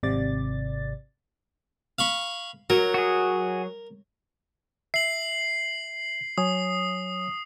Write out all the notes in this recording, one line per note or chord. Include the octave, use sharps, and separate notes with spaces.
G#1 C3 D5 A6
F5 B5 C#6
F#3 A#4
F#4 G#4
E5 C7 F#7
F#3 C#5 G#5 D#6